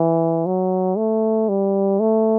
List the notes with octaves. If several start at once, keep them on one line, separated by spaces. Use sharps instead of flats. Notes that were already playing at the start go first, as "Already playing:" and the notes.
Already playing: E3
F#3
A3
G3
A3